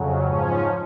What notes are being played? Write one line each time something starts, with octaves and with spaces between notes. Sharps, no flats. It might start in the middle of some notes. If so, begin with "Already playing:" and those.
Already playing: F2 C#3 F#3
G#2 F3 C#4